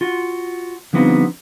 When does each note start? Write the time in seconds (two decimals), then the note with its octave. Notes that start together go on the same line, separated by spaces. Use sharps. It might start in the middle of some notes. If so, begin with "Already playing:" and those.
0.01 F4 F#4
0.93 D3 F3 G3 B3 C4 D#4